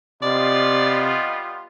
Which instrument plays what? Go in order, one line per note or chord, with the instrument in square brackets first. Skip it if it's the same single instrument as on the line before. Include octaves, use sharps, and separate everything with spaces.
[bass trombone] C3 [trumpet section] G3 B3 F4 [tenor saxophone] D5 [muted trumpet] D#5